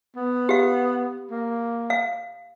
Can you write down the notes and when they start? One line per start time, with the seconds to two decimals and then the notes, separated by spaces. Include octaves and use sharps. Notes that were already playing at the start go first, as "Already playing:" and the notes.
0.16 B3
0.49 G4 F5
1.31 A#3
1.90 F5